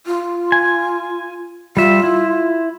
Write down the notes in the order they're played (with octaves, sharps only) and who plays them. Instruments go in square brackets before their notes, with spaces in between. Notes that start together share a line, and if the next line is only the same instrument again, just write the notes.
[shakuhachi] F4
[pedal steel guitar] G#5
[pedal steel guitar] G3 E5 [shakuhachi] F4
[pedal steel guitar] E4